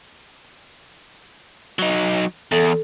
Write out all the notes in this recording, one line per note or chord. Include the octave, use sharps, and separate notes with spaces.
F#3 D#4
E2 A4